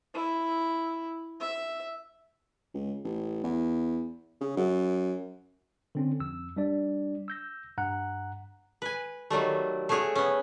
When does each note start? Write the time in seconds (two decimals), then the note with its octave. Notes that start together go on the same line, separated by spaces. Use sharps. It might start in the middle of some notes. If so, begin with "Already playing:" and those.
0.14 E4
1.40 E5
2.74 C#2
3.04 A1
3.44 E2
4.41 C#3
4.57 F#2
5.95 D3 C4 C#4
6.20 F2 E6
6.56 G3 D4 D5
7.28 E6 G6 A#6
7.78 G2 F#5 A#5 F#6
8.82 B4 G#5
9.30 D#3 F#3 G3 A3
9.89 A3 C#4 F#4 G#4 C#5
10.15 B3 C#4